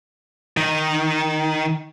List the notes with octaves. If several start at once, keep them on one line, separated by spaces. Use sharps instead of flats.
D#3